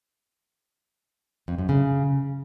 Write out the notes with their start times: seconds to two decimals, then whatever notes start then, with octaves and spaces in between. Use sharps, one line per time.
1.48 F2
1.58 F#2
1.69 C#3